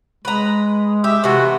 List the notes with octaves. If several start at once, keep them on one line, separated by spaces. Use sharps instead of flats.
G#3 B4 A#5
G4 E5
C3 E3 A3 F#4